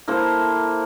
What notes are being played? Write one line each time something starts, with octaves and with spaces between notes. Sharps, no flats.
A#3 E4 A4 C5